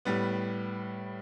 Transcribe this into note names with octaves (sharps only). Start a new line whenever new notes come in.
A2 G3 B3